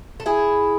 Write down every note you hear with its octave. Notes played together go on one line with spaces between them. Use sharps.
A4
E4 G#4